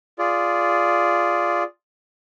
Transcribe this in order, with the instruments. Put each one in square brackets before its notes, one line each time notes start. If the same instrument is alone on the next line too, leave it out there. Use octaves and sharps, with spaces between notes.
[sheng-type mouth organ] F4 G#4 D5